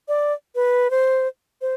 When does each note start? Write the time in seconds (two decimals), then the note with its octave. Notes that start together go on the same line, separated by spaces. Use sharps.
0.08 D5
0.55 B4
0.91 C5
1.61 C5